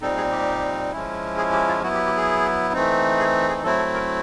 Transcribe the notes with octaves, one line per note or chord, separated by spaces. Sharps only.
A#2 G3 C4 D#4 A4
G#4
G4
F3 G#3 C#4 E4
G#4
G4
F4
F#3 B3 E4 F#4
G4
G4
G#4
E3 A3 C4 D#4
G#4
G#4
F#3 A3 C4 E4 A4
A4
A#4